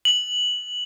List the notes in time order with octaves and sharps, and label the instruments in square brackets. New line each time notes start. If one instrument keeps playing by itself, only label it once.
[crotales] F#7